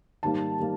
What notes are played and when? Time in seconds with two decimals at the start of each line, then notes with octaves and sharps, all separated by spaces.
0.23 G#2 D#3 G3 A#3 A5
0.59 D#3 G3 A#3